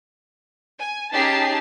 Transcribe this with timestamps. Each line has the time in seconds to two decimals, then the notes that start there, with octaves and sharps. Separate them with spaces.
0.80 G#5
1.13 C#4 D#4 G4 G#4 A5 C7